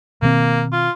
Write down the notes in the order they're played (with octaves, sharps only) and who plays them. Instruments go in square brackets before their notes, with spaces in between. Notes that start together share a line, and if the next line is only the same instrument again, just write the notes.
[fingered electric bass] B2 D#3 C4 [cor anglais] A#3
[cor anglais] F4